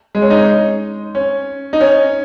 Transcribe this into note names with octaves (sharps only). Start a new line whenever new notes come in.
G#3
C#4
D#4
C#4
D#4
C#4